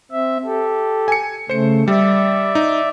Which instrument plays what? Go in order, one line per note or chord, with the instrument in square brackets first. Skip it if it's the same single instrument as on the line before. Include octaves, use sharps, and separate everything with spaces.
[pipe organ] C4 E5
G4 A4
[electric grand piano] G#5 C#7
[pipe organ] C#3 A3 [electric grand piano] C5 C#7
[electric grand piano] G3 [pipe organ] D5 E5
[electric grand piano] D#4